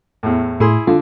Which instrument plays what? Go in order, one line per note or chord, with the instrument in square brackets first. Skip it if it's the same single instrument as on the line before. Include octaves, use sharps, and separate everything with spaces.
[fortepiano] E2 A2
[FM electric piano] A2 [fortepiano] E4 G#4 C6
[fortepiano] D3 [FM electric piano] F4